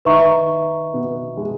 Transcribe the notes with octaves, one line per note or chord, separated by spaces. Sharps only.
D#3 D#4 B4 E5 A#5 C#6
B2 B3
G#3